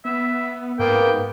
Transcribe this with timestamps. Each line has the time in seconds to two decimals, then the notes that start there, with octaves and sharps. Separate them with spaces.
0.05 B3 E5
0.79 G#2 A#3 B3 G5